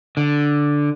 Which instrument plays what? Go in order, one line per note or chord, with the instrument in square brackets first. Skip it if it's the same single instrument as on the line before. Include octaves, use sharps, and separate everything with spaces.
[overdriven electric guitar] D3